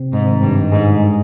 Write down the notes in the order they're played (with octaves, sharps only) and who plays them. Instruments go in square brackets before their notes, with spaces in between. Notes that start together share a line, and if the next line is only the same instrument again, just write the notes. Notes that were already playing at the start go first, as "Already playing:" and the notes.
Already playing: [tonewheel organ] C3
[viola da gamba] G#2
[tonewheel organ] D#3
[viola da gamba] G2
[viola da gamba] G#2 [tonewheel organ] G#3